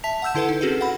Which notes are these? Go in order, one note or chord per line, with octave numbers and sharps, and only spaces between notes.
E5 A5 B6 F7
F#5 A5 E6 G6 E7
D3 E4 A4 B4 F#5
D#4
C4 C#4 F#4 G#4 A4 B4
F#5 B5